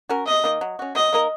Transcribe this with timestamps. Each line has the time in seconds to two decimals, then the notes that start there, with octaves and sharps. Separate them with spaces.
0.09 C#4 F#4 A#4
0.26 C3 D#5
0.44 D#3 A#3
0.61 F#3
0.79 C#4 F#4
0.95 F#3 D#5
1.12 A#3 D#4 A#4